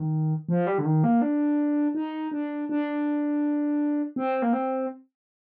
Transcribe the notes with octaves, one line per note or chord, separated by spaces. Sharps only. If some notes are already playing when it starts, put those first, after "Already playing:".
Already playing: D#3
F3
G3
D3
D#3
A#3
D4
D#4
D4
D4
C4
A#3
C4